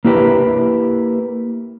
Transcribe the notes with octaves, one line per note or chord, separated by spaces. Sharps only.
A#3 E4 G4 B4